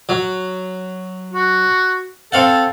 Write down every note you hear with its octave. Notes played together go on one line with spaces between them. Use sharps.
F#3
F#4
C4 A4 F5 F#5